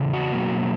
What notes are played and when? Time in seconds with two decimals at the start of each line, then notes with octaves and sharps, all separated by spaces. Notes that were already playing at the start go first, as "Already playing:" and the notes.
Already playing: E2 C#3
0.13 F#4
0.33 B2 F#3 A#3